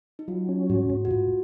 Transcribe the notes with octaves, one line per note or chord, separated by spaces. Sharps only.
D#4
F#3 F4
C#4
G#2 F#4
G#2
F#4
G#2 F4